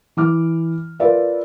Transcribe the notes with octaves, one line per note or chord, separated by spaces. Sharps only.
E3 D6 F6
F4 A#4 B4 D5 E5